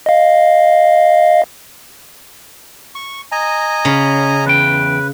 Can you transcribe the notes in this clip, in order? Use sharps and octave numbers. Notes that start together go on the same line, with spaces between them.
D#5 F5
C#6
D#5 G#5 A#5
C#3
E2 B4 G5